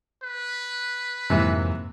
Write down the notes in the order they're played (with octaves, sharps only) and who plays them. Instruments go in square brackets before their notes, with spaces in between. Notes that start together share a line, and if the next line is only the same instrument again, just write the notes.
[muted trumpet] B4
[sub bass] F2 [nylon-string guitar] G#2 F#3 A#3 [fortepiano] C3 E3